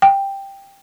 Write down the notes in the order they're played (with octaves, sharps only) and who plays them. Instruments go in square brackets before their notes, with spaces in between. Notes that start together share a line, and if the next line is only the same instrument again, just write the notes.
[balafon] G5